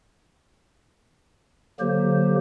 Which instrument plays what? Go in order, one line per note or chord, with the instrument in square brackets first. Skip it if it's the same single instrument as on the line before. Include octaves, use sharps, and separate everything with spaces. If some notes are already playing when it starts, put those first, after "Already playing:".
[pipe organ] D3 F#3 A#3 G4 C5